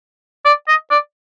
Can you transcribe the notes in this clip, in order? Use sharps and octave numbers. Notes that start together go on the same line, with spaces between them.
D5
D#5
D5